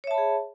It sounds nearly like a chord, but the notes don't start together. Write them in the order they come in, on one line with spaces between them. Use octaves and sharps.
C#5 E5 A5 B5 G#4